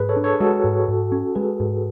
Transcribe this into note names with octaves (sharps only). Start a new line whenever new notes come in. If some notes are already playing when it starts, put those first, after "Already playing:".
Already playing: G#2 G#4 B4
A4 C#5
D4
A4 C#5
G#4
G#3 F#4 A4
G#2
G#2
C#4
G#3 G#4 B4
G#2